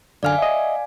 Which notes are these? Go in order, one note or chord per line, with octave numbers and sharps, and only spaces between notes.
F#2 D3 D5 F5 G#5 F6
D#5 E5